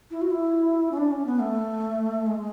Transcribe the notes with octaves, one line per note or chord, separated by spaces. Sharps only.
E4
F#4
E4
C#4
D4
C#4
B3
A3
G#3